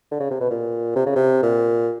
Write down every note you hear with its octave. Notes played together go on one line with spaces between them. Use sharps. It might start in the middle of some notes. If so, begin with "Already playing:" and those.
D3
C#3
C3
B2
A#2
C3
C#3
C3
A#2